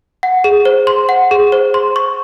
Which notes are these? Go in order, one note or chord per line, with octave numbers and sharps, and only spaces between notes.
F#5
G#4
C5
C6
F#5
G#4
C5
C6
C#6